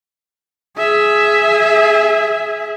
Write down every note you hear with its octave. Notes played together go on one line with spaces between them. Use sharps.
G#4 E5